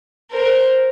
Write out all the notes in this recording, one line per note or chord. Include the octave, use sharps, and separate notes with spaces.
A#4 C5